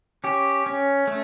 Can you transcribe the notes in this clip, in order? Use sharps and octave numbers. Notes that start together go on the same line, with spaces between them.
C#4 G4
C#4
A3